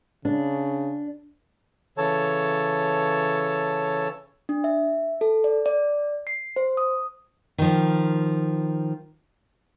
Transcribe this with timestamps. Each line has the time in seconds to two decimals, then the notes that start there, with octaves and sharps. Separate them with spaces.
0.25 C#3 D4
1.98 C#3 E3 A4 C#5 A5
4.49 D4
4.64 E5
5.21 A4
5.44 D5
5.66 D5
6.27 C7
6.56 C5
6.77 D#6
7.58 D#3 F3